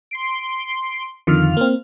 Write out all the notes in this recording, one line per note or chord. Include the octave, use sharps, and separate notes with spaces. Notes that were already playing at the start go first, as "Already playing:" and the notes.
C6 C7 D7
F2 D3 D#3 F4 F6
A#3 C4